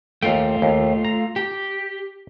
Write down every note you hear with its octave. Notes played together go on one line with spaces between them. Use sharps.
D#2 A3 F4 G5
D#2
A#5
G4